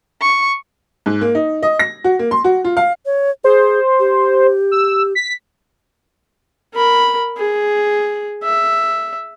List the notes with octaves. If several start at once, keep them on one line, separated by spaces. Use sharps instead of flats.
C#6
G#2
A#3
D#4
D#5
A#6
F#4
A#3
C6
F#4
F4
F5
C#5
G#4 C5
G4
E6
B6
A#4 B5
G#4
E5